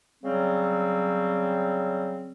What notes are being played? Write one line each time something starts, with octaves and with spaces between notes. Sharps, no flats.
C#3 F#3 G3 C4